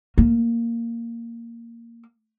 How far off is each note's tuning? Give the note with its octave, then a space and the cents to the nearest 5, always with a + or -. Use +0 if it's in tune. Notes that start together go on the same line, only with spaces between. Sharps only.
A#3 -5